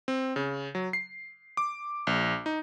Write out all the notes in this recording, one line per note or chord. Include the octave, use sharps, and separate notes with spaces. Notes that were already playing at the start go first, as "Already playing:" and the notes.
C4
C#3
F#3
C7
D6
A#1
D#4